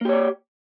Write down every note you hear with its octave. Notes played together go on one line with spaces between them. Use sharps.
A#3 G4 C#5 D5